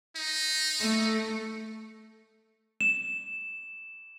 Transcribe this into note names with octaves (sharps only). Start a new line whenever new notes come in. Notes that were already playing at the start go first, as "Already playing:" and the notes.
D#4
A3
E7